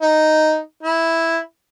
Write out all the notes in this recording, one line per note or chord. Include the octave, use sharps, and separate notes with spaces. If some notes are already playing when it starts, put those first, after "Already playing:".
D#4
E4